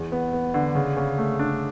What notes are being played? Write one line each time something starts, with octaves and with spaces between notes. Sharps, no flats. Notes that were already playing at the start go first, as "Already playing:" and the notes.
Already playing: E2
B3
B3
D3
C#3
C#3
A3
D4